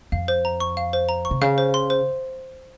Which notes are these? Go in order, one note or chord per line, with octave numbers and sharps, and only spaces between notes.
F2 F5
C5
A#5
C#6
F5
C5
A#5
C#6
C3
C#3 F5
C5
C6
C5